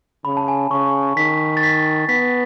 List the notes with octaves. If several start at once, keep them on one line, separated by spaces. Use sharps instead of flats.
C#3 B5
A5
G#5
C#3 C#6
D#3 B6
A6
B6
B3 B6